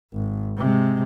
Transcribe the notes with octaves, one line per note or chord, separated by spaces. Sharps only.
G#1
C3 G#3